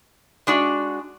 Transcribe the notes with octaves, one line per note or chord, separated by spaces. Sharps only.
G#3 D4 F#4